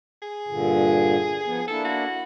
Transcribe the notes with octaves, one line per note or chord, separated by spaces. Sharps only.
G#4
G2 A#2 D3
F3 B3
A#3 D4 E4 A4
F#4